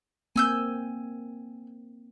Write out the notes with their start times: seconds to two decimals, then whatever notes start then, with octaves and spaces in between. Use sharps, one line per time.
0.36 A#3 C4 G#5 E6 G6